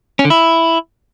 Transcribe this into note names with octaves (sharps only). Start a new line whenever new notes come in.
C#4
D3
E4